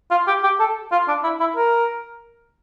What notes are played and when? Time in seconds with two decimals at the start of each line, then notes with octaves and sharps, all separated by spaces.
0.11 F4
0.27 G4
0.44 G4
0.60 A4
0.92 F4
1.08 D4
1.24 E4
1.40 E4
1.56 A#4